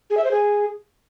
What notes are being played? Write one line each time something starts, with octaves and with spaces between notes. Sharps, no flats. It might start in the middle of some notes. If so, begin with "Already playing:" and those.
G#4
E5
C5
G#4